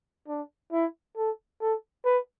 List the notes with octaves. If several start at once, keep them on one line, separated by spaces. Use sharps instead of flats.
D4
E4
A4
A4
B4